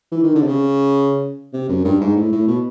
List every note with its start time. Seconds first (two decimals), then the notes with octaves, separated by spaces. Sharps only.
0.12 E3
0.23 D#3
0.35 D3
0.42 C3
0.47 C#3
1.53 C3
1.69 F#2
1.85 G2
2.01 G#2
2.16 A2
2.32 A2
2.48 B2